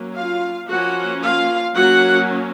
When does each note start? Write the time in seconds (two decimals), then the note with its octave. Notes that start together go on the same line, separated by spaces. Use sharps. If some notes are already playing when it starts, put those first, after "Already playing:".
Already playing: F#3 A#3 C#4
0.17 F4 F5
0.69 F3 A#3 C#4 F#4 F#5
1.21 F4 F5
1.75 F#3 A#3 C#4 F#4 F#5